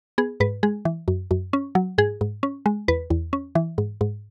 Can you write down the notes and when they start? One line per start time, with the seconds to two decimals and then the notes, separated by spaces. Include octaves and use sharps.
0.18 B3 G#4
0.40 G#2 B4
0.63 G#3 G#4
0.85 E3
1.08 F#2
1.31 F#2
1.53 C#4
1.75 F#3
1.98 G#2 G#4
2.21 G#2
2.43 C#4
2.66 G#3
2.88 E2 B4
3.10 E2
3.33 C#4
3.55 E3
3.78 G#2
4.01 G#2